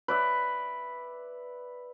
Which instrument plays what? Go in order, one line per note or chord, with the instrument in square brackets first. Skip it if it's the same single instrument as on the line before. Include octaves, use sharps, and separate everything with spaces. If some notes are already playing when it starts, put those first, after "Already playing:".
[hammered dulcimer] B4 D5 E5